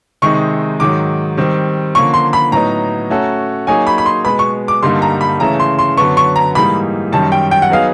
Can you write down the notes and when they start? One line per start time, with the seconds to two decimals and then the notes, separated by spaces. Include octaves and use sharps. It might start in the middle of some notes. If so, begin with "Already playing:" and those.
0.22 C3 D#3 G#3 C4 D#4 C#6
0.80 G#2 D#3 F#3 D6
1.37 D#3 G3 C4
1.95 D3 F3 A#3 C#4 C#6
2.14 C6
2.33 B5
2.52 A2 F#3 B3 D#4 A#5
3.10 A3 C#4 F#4 A4
3.67 F#3 A#3 D#4 G#4 C#5 G#5
3.87 B5
3.98 B5
4.06 C6
4.24 B2 G#3 B3 B5
4.39 C#6
4.68 D6
4.82 G2 D3 G3 A#3 D#4 C6
5.02 A#5
5.21 B5
5.40 C#3 E3 A3 A#5
5.60 C6
5.79 C6
5.97 F#2 D3 F#3 B3 C#6
6.17 C#6
6.36 A#5
6.55 G#2 E3 G3 A#3 D#4 B5
7.12 F#2 D#3 G3 A5
7.32 G5
7.51 G5
7.62 F#5
7.70 F#3 B3 D#4 G#4 F5